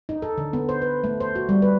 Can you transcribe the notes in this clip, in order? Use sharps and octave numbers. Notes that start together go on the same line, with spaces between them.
D#4
A4
D3
B3
C5
B4
A3
C5
F#4
G3
B4